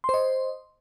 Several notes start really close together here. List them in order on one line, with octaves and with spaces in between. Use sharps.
C6 C5 D#5